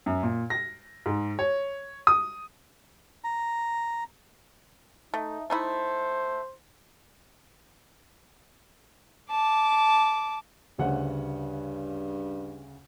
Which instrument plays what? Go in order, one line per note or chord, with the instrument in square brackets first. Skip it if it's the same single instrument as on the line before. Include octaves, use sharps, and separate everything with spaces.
[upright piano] F#2
A#2
A#6
G#2
C#5
D#6
[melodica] A#5
[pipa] A3 [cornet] D#4
[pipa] A3 D#4 E4 [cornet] C5
[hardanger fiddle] A5 D6
[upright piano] D2 C#3 F#5 [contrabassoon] G2